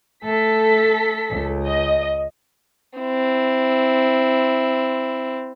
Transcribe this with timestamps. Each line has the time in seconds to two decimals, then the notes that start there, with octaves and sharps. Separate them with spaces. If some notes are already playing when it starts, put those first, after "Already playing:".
0.24 A3 A4 B6
1.30 C#2
1.68 D#5
2.99 C4 E4